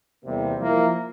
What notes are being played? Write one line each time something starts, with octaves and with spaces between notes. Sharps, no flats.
E2 C3 G3 A#3
F3 A#3 E4 A#4